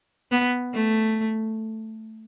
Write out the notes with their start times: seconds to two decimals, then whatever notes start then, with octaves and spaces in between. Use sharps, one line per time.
0.31 B3
0.74 A3